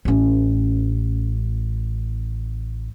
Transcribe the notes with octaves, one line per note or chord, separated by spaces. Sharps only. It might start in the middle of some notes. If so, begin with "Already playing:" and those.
A1 C#4